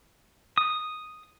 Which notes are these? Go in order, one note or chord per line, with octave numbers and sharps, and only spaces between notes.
D#6